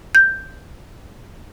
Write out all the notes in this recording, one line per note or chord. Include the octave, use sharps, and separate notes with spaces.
G6